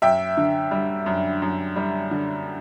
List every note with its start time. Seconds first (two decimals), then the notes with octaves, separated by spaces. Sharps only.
0.02 F#2 E5 G5
0.37 D3
0.71 G3
1.06 F#2
1.42 F#2
1.76 G3
2.11 D3